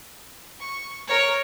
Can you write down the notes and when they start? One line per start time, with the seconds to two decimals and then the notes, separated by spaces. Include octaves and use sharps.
0.60 C#6
1.07 A#4 C#5